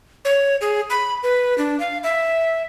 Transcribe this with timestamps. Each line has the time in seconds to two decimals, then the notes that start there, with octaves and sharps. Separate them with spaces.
0.25 C#5
0.61 G#4
0.90 B5
1.23 B4
1.58 D4
1.80 F5
2.03 E5